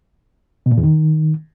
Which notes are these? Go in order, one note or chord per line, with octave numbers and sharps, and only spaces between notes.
B2
A#2
E2
D#3